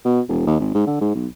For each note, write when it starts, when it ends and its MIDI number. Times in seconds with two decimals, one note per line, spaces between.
0.05 0.21 47
0.29 0.45 28
0.47 0.56 39
0.60 0.74 32
0.74 0.84 44
0.87 0.98 50
1.01 1.13 44
1.15 1.27 35